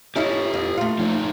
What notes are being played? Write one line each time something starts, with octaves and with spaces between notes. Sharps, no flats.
C#4 D#4 E4 G4 A4
F2
A3 F4
F3 D#4 A4